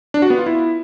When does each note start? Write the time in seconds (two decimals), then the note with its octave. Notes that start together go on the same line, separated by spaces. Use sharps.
0.14 D4
0.22 F#4
0.30 B3
0.38 F4
0.46 E4